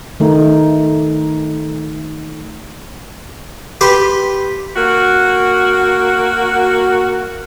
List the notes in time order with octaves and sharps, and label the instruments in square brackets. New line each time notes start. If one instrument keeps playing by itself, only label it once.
[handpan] D#3 A3 D#4
[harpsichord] G4 B4 G5 C6 D6
[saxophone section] A#3 F#4